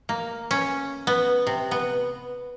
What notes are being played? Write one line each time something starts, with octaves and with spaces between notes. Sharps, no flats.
A#3
C#4
B3
C3
B3